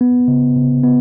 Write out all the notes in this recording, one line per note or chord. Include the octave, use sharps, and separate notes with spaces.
B3
C#3
C#3
B3